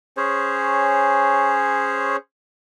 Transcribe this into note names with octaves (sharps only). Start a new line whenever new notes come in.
C#4 G#4 C5 C#5